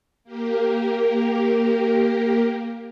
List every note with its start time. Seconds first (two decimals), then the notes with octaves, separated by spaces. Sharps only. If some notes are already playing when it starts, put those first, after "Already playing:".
0.24 A#3 G4 A#4